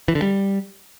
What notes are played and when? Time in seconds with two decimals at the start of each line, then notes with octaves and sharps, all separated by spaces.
0.08 E3
0.15 D3
0.22 G3